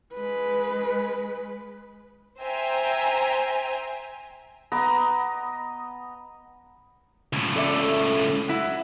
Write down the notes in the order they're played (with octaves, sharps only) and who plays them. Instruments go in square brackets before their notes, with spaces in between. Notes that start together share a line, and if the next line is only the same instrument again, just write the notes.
[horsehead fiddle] G#3 B4
[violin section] C5 E5 G5 G#5 A#5
[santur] B3 D#5 A#5 D6
[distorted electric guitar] C#2 A2
[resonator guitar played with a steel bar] A4 D5 E5
F#3 E4